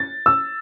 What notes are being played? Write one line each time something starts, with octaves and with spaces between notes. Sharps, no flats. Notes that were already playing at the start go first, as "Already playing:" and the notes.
Already playing: A6
E6